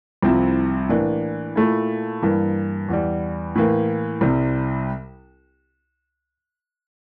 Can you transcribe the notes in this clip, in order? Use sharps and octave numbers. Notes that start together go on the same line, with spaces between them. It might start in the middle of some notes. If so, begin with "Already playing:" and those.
C2 C3 F3 C4 E4
A2 E3 A#3 D4
A#2 A3 E4
G2 E3 A#3
E2 E3 G3
A2 E3 A#3
C2 C3 G3 C4